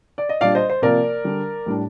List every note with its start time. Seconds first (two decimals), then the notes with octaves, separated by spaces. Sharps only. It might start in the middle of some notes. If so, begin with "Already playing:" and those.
0.18 D5
0.29 D#5
0.41 A#2 G3 D4 D5 F5
0.55 C5 D#5
0.70 C5
0.82 C3 F3 A#3 A#4 D5
1.24 D3 G3 D4
1.66 A2 G3 D4